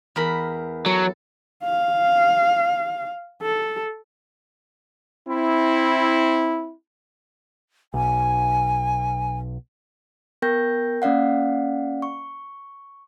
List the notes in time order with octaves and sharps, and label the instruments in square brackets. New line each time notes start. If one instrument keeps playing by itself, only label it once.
[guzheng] E2 A#4 B5
[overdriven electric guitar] F#3 [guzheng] A4
[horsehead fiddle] F5
A4
[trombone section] C4 E4
[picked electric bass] B1 [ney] G#5
[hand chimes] B3 A#4 G5 G6 A#6
A#3 C#4 D5 F5 F#5
C#6